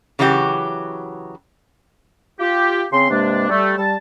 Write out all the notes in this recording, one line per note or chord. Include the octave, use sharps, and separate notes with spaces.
C#3 E3 F#3 F#4 G4
F4 G4
C#3 C4 C6
G2 C3 G#3 A#3 D4
G3 A3
G3 A5